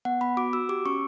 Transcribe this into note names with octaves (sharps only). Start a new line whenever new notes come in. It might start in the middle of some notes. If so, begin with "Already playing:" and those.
B3 F#5
B3 B5
F#4 D6
F#4 E6
G4 D6
C#4 C#6